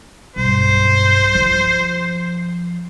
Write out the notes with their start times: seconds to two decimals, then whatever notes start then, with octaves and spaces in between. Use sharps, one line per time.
0.36 B1 G2 C5
1.35 F3